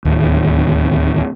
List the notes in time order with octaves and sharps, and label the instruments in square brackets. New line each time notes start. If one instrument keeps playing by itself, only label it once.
[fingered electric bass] D1 D#2